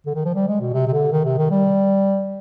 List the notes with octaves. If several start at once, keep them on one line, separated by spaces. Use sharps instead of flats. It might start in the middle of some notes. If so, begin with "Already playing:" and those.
D3
D#3
F3
G3
G#3
B2
C3
C3
D3
D#3
C3
D#3
G3